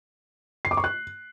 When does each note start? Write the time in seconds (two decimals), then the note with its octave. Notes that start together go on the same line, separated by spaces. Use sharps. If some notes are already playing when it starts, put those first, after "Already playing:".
0.65 C7
0.71 D6
0.77 C#6
0.84 F#6